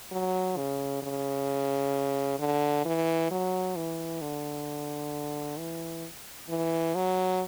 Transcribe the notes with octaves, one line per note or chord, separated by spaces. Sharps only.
F#3
C#3
C#3
D3
E3
F#3
E3
D3
E3
E3
F#3